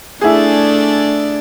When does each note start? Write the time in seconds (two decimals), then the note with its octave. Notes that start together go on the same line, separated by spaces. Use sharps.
0.21 A3 D4 E4 G#4 D5